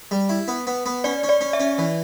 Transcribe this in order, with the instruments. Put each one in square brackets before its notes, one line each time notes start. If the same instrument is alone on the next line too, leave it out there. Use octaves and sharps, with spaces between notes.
[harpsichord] G3
E4
B3
B3
B3
[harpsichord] C#4 [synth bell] D5
[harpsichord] C#4
[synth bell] D5
[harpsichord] C#4
[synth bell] E5
[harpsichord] C#4
E3